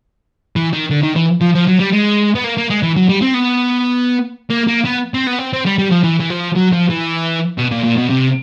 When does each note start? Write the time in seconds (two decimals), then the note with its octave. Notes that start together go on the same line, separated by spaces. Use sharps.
0.56 E3
0.73 D#3
0.90 D3
1.03 D#3
1.16 E3
1.41 F3
1.55 F3
1.68 F#3
1.80 G3
1.93 G#3
2.35 B3
2.44 A#3
2.57 A#3
2.70 G#3
2.83 E3
2.96 F#3
3.09 G3
3.22 C4
3.34 B3
4.50 A#3
4.67 A#3
4.85 B3
5.14 C4
5.27 B3
5.39 C4
5.53 C4
5.66 G3
5.78 G3
5.91 F3
6.03 E3
6.20 E3
6.30 F3
6.56 F#3
6.72 F3
6.90 E3
7.58 B2
7.71 A#2
7.84 A#2
7.97 B2
8.09 C3